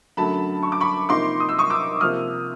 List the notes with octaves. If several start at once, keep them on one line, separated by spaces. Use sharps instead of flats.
F#2 D3 F#3 A3 A5 B5
C#6
D6
B5 C#6
C3 F3 A#3 D#4 C6 D6
D#6
E6
C#6 D#6
D6 E6
C3 F3 A#3 D#6 F6